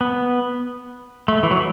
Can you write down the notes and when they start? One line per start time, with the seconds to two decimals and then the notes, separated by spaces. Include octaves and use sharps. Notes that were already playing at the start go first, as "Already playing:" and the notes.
0.01 B3
1.28 A3
1.43 E3
1.51 F#3